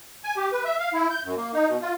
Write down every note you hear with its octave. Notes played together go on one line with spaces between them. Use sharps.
G#5
G4
B4
E5
F5
E4
G6
F#2
A#3
D#4
B2
F4